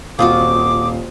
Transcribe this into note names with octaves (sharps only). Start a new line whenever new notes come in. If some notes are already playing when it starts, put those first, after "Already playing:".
D#1 C4 F4 F#4 F5 D6 D#6